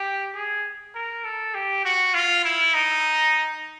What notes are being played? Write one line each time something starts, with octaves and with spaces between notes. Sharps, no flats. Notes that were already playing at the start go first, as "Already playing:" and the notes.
Already playing: G4
G#4
A#4
A4
G4
F#4
F4
E4
D#4